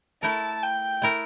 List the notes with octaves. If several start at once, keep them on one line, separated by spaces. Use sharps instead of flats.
A3 E4 A#4 A5
G5
A3 E4 A#4